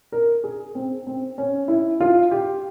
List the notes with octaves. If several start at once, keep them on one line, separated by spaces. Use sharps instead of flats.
A#4
G#4
C4
C4
C#4
E4
F4
G4